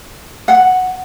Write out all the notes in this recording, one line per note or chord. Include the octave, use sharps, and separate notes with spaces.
F#5